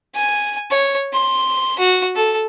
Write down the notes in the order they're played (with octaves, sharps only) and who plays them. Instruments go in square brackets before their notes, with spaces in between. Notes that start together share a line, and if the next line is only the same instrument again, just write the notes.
[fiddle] G#5
C#5
C6
F#4
A4